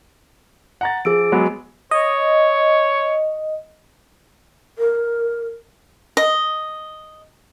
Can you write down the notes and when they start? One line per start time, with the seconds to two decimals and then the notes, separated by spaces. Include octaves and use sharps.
0.81 F#5 A#5 A6
1.05 F3 G#4 E6 D7
1.32 F#3 G#3 B3
1.91 C#5 D#5
4.78 A#4
6.17 D#5